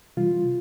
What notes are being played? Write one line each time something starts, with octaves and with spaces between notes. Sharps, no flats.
C3 E3 G3 F4